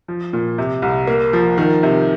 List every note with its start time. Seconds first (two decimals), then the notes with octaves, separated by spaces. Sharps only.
0.08 F3
0.33 A#2
0.58 C3
0.82 C2
1.07 A#3
1.33 F3
1.58 D#3
1.83 C3